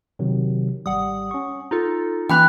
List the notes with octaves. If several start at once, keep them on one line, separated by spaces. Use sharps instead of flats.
C3 D#3 F#3
G#1 G3 F#5 D#6
C#4 C#6
D#4 F4 A4 A#5
E3 A#3 C#4 G5 B5 F#6